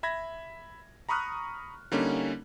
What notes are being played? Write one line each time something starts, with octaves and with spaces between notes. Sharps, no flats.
E5 B5 G#6 A#6
A#5 B5 C#6 D#6 F6 F#6
D3 G3 A#3 C#4 D#4